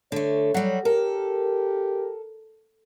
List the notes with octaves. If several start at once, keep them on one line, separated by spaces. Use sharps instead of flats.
D3 A3 C#5
F#3 G3 F#5
G4 A4 A#4